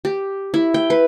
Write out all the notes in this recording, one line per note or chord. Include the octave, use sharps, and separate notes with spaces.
G4
E4
G5
B4